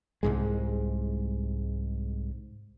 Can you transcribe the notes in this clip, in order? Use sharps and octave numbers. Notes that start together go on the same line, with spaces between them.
C2 G#2 G#3